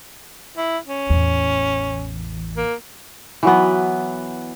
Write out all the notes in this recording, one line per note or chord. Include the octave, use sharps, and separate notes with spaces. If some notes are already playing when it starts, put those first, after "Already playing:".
E4
C#4
A1 E2
A#3
E3 F#3 B3